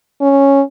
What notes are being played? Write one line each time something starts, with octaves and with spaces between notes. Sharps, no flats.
C#4